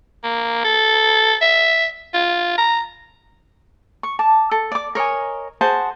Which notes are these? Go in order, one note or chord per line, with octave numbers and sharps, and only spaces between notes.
A#3
A4
E5
F4
A#5
C#6
A5 D6
A4
D5 D6
A#4 C#5 D#5 G#5
F#4 G#4 C5 A5